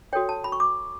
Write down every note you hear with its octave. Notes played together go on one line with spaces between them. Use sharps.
F#4 A4 C#5 G5
A5
B5
C#6
D6